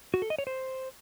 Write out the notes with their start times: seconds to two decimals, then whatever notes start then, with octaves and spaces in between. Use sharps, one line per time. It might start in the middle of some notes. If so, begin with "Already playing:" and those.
0.14 F#4
0.22 A4
0.30 D#5
0.39 C#5
0.47 C5